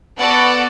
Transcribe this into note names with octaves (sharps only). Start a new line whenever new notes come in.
B3 F#4 A4 D5 F#5